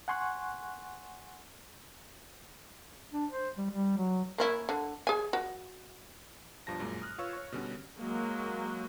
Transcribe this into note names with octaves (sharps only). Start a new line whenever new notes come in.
F#5 G#5 C6 C#6 F#6
D4
C5
G3
G3
F#3
A#3 C#4 E4
D3
G#4 G#5
F#4
B1 G2 F3 A5 A#6
F#2 A#2 G#3
D#6 F6 F#6
F4 B4 C#5 F5 C#6 E6
C#5 C#6
B2 D3 G3 C#4
F#3 G#3 A#3